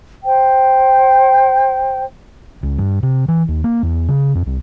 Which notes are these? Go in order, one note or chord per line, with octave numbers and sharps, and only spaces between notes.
C5 G5
C#2
G2
C3
E3
D#2
A#3
E2
C#3
F2
C2